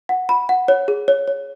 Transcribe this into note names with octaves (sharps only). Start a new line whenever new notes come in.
F#5
B5
F#5
C#5
G#4
C#5
C#5